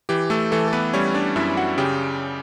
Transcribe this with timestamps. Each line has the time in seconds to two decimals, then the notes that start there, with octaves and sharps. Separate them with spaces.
0.09 E3 G4
0.30 A3 A4
0.52 E3 A3 A4
0.68 A4
0.73 B3 B4
0.93 G3 C#4 C#5
1.14 D4 D5
1.36 F#2 E4 E5
1.57 F#4 F#5
1.78 C#3 G4 G5